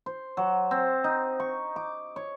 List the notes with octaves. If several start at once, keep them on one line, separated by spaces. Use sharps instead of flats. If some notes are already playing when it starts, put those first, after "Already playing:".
C5
F#3
C4
D#4
C#6
D6
C#5